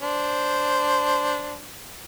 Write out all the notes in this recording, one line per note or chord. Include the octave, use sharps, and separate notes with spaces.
D4 C5